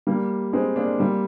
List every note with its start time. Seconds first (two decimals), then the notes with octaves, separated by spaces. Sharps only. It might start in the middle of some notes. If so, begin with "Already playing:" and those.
0.07 G3 A#3
0.53 G#3 C4
0.76 A#3 D4
1.00 G3 A#3